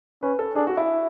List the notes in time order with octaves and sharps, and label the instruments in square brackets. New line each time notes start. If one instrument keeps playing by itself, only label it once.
[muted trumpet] C#4 [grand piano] B4
[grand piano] A4
[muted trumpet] D4 [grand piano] G#4
[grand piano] F#4
E4